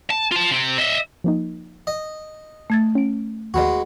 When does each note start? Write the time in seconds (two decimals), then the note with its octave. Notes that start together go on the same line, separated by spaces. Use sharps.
0.11 A5
0.32 F4 A5
0.52 C3 C4
0.78 D#5 E5
1.24 F3 A#3 D#4
1.87 D#5
2.70 A3 G#6 A6
2.95 C#4 D7
3.54 D#2 G#3 B3 F#4 D5